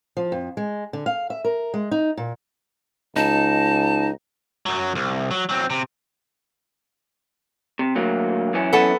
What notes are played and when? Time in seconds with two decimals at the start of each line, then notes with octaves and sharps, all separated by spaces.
0.17 F3
0.32 F2
0.57 G#3
0.93 D3
1.06 F5
1.30 E5
1.44 A#4
1.74 G#3
1.91 D#4
2.17 A#2
3.16 C#2 D#4 A5
4.66 F#2 F#3
4.95 C2
5.31 F#3
5.49 F#3 C4
5.70 C3
7.79 C3
7.95 D2 F#3 A#3
8.53 F#2 E3 C#4
8.73 B3 A4 G#5